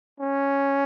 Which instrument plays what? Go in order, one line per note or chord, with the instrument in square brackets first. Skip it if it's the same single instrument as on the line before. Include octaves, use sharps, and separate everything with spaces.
[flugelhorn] C#4